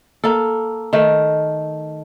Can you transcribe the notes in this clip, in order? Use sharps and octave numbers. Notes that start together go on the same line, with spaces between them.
A#3 A4
D#3 A3